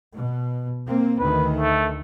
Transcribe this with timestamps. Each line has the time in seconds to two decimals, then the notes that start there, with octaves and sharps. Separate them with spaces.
0.13 B2
0.87 A#3 C4
1.19 D2 D#3 B4
1.54 A3